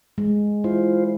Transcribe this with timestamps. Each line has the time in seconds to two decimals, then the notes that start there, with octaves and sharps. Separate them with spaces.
0.18 G#3
0.64 E4 F4 C5